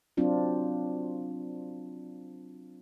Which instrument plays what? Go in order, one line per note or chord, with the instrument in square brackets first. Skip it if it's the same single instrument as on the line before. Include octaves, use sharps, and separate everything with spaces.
[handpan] F#3 C4 D4 F4